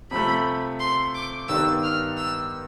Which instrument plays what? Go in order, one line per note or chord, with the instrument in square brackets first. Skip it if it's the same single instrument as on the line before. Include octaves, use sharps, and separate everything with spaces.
[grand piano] C3 F3 A3 [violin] B5
[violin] C6
D6
[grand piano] G2 D#3 G3 B3 D4 [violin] E6
[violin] F6
E6